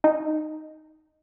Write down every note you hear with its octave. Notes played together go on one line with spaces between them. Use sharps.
D#4